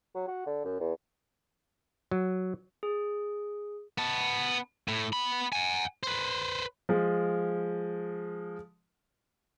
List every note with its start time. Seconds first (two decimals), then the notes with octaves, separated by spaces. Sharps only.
0.15 F#3
0.28 F#4
0.46 D3
0.65 F#2
0.80 E2
2.11 F#3
2.83 G#4
3.98 B3 A5
4.88 A2
5.13 B3 B5
5.53 F#5 G#5
6.03 B4 C5
6.89 F3 G#3